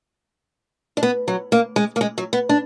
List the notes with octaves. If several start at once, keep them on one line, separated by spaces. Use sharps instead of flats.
D4
B3
F#3
A#3
G#3
A#3
G#3
F#3
B3
D4